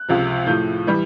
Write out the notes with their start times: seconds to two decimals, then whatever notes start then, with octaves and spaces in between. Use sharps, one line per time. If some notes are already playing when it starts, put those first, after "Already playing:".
Already playing: F#6
0.08 C#2 C3 F3
0.46 A2 F3 G6
0.87 E3 G3